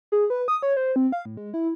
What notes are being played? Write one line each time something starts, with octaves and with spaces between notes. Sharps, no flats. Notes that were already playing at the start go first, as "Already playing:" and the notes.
G#4
B4
D#6
C#5
C5
C4
F5
A2
G#3
E4